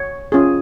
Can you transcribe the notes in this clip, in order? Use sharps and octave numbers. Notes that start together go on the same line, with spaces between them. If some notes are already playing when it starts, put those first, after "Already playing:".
Already playing: C#5
C#4 F4 G#4